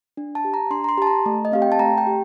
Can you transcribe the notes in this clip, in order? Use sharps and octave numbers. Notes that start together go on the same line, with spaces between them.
D4
A5
G4
A#5
D4 C6
A#5
C6
G4 A5
A#5
A3
D#5
C4 G4 F5
G5
A5
A3 A#5
G5
G4